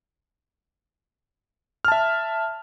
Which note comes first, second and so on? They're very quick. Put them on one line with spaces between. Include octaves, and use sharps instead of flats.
F6 A5 E5